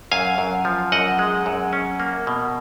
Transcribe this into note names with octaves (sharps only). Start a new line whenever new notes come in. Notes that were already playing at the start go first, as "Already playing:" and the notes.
F#2 F5 G#5
F#2
F3
F#2 D#5 F#5
G#3
F#2
C#4
A#3
B2